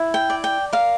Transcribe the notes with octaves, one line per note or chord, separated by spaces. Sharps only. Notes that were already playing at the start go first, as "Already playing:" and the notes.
Already playing: E4
G5
D5
G5
A#4 F5